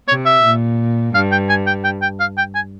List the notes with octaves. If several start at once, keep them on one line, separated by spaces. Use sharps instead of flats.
C3 C#5
E5
A#2
G2 F5
G5
G#5
G5
G5
G5
F5
G5
G#5